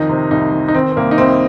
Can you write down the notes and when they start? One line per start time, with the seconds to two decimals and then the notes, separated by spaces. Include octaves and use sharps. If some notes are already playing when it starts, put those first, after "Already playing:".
Already playing: F2 D#3 D#4
0.09 C3
0.31 C2 D#4
0.53 D#3
0.68 D#4
0.75 D#3 C4
0.92 C4
0.97 C2 A#3
1.11 D#4
1.18 C2 C4